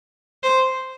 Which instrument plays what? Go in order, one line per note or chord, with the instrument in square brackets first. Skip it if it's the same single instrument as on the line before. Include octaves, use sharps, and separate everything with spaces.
[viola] C5